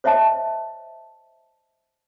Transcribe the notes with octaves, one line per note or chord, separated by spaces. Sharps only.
C5 C#5 D#5 E5 A5